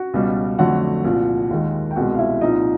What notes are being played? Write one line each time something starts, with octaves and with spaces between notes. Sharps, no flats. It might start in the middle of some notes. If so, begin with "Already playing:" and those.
Already playing: F#4 F#5
C#2 B2 G3
F2 D3 F#3 A3 F#4 F#5
C2 A#2 F3
D#2 D#3 G#3
G5
C2 B2 G#3 F#4 F#5
F5
E4 E5
C2 A#2 F3 D#4 D#5